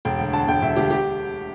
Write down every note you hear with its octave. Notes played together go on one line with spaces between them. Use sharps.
E1 G5
D2
D3 A5
E1 G5
E1 E5
D2 G4
G4